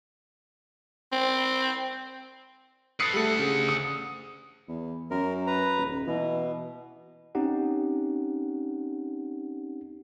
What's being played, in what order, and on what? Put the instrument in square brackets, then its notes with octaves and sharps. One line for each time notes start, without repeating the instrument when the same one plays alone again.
[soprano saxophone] C4
[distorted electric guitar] A4 B4 [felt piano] D#6 C7 C#7
[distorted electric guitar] D2 F#5 [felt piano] G3 A3
[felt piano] C#3
D#6
[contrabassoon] E2
[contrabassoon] F#2 [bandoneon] A#4
[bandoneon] B4 A#5
[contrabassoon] D#1
[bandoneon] B2 [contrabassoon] E3
[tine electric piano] C4 C#4 D#4 G4 F#5